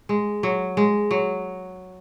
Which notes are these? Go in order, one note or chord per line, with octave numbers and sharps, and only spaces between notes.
G#3
F#3
G#3
F#3